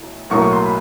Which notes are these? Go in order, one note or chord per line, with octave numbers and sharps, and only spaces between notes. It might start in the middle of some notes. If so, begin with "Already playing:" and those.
Already playing: B1 A2
B1 A2 F#3 A#3 C#6
C#6
C6
B5